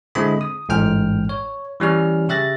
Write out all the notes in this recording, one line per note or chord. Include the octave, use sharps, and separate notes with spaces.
D3 G#3 C4 E4 D#5 B5
D#6
A1 G#2 G5 F6
C#5
E3 G3 C#4 F6
C#3 G4 E5 F#6 A6 A#6